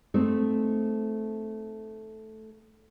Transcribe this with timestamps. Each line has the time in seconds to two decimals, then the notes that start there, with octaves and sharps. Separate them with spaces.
0.14 A3 C4 D#4